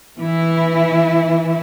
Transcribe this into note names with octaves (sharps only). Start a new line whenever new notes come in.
E3 E4